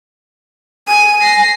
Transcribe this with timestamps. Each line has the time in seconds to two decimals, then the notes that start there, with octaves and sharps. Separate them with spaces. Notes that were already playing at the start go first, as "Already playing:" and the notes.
0.88 G#5 D#7
1.22 A#6 C7